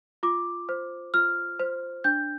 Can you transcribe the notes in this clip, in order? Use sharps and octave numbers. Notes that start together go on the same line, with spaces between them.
F4 D6
C5
F4 F6
C5
D4 G6